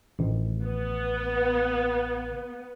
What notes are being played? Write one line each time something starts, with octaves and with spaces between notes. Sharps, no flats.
A1
B3